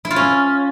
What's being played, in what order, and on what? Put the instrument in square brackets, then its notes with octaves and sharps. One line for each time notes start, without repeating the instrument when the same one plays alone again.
[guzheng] E4
F4
C#4